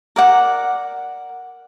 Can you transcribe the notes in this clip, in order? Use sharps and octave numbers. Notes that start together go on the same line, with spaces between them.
A#4 D5 F#5